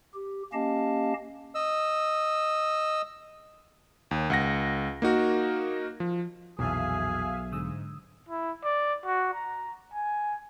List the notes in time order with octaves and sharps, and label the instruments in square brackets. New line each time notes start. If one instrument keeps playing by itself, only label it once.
[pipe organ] G4
A#3 C#4 G4 D#5 F5 A5
[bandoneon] D#5 E6
[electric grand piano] D#2
C#2 F#5 A#6
A#3 D#4 F#4 A#4
F3
[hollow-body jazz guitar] B1 [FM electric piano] F2 A#2 E3 [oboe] G#4 [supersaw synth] E5 F5 G#5
[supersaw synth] G#2 [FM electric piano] D3 D#6 E6
[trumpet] E4
D5
F#4
A#5
G#5